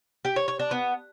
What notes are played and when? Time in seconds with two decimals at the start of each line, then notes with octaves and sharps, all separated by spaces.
0.25 G4
0.36 C#5
0.48 C#5
0.59 D4
0.71 B3